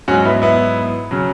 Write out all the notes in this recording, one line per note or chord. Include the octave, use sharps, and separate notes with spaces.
G#2 F#3 C#4 F#4
B3 E4
B3 E4
C#3 F#3